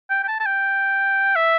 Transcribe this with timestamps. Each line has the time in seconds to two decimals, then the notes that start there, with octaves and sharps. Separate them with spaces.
0.10 G5
0.23 G5
0.28 A5
0.40 A5
0.46 G5
1.36 E5